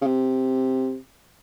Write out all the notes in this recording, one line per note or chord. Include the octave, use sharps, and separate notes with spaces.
C#3
C3